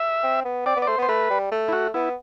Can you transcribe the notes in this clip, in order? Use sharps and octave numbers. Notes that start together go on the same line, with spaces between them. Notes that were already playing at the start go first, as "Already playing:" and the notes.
Already playing: E5
C4
B3
C4 D5
B3
D5
A3 C5
B3 C5
A3 B4
G3
A3
E4
F#4
B3 E4